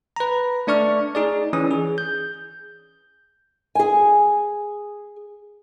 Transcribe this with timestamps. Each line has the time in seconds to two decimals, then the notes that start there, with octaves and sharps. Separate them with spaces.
0.16 B4 A#5
0.67 A3 D4 D5 C#6 F6
1.15 D#4 G#4 D5
1.53 E3 C#4 D#6
1.71 G#4
1.98 G6
3.75 G#4 G#5